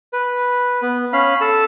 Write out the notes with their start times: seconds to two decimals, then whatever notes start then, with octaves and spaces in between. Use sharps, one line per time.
0.13 B4
0.82 B3
1.13 C#4 F5 B5
1.41 A4 A5